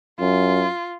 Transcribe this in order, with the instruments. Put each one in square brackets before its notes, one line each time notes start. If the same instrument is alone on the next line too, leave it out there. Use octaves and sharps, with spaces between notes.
[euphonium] F#2 [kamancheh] F4